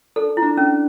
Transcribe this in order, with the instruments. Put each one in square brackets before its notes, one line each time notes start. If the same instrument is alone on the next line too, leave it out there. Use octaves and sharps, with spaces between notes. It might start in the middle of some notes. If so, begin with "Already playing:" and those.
[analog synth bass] D4 [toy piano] A4
[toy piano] E4
[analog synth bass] D4
[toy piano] C#4